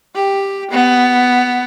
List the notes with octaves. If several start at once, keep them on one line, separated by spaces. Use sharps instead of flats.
G4
B3